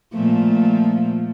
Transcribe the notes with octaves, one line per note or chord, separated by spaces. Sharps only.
A#2 F3 A3